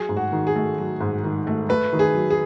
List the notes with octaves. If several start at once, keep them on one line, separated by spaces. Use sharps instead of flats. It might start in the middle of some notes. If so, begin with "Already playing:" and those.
Already playing: F#3 G#4
G#2
F#4
D#3
G#4
A3
F#3
G#2
D#3
A3
A3 B4
D#3
G#4
F#3
G#4